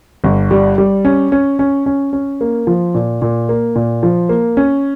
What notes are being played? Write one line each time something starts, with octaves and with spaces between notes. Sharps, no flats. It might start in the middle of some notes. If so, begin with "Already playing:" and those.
G1
G3
G3
C#4
C#4
C#4
C#4
C#4
A#3
F3
A#2
A#2
A#3
A#2
F3
A#3
C#4